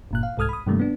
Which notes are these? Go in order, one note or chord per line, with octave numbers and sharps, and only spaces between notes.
G1 A#2 F#6
F5
C2 G#2 A4 D#6 F6 G#6
B5 D#6
G2 C3 D#3 G3 A3 A#3
B3 D4